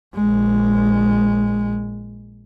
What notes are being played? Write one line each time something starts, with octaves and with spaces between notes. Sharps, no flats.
A#1 G#3